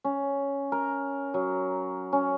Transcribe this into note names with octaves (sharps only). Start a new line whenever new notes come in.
C#4
A#4
F#3
C#4